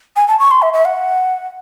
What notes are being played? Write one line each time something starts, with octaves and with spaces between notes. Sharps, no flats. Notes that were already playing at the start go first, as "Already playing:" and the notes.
G#5
A5
C#6
C6
E5
E5
F#5